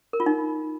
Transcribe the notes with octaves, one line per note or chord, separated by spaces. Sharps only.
A#4
F4
D#4